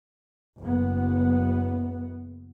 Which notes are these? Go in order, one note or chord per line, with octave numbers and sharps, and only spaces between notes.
F#1 B3